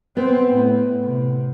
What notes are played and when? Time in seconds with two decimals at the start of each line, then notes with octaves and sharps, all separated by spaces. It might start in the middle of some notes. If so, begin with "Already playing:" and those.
0.17 B3 C4
0.53 A2
1.05 C3